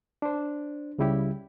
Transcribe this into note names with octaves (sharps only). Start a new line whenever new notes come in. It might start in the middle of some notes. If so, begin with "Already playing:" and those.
D4 C5
C#2 C#3 G3 E4 G4